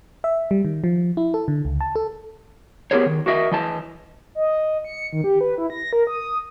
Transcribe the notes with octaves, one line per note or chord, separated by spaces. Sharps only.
E5
G3
D#3
F3
E4
A4
D3
C#2
A5
A4
B3 G4 G#4 A#4 C5 C#5
D#3
F#4 A#4 D#5 E5
E3 D#5 A5
D#5
C#7
D#3
G4
B4
E4
A#6
A#4
D#6